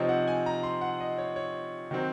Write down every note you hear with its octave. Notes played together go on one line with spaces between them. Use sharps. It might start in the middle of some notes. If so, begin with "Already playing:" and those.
Already playing: C3 F3 C4 D#4 C#5 D#5
F#5
G#5
A#5
C6
F#5
D#5
C#5
C#5
D#3 F#3 C4